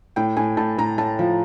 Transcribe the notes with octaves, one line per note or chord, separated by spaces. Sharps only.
A2 G5
A2 G#5
A2 A5
A2 A#5
A2 A5
F3